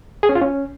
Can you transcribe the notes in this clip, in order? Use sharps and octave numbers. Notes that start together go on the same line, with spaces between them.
G#4
C#4
F4
C#4